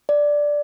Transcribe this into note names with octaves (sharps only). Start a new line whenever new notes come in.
D5